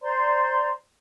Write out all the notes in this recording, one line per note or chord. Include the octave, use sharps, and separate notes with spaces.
C5 D5 A#5 C6